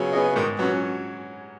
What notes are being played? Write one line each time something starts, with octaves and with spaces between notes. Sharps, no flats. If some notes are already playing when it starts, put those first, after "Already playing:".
Already playing: C#3 F#3 B3 G#4
B3 G#4 D#5
G#2 D#3
F#3 B3 C#4